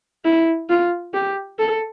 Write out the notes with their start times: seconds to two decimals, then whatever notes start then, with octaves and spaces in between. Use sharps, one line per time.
0.25 E4
0.69 F4
1.14 G4
1.59 A4